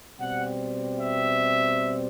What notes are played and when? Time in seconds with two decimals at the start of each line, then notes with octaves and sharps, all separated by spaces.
0.19 B2 G3 C4 F#5
0.99 E5